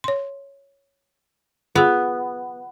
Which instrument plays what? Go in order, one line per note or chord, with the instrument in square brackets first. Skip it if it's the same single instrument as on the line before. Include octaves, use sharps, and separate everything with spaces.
[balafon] C#5 C6
[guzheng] B3 [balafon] F4 G#4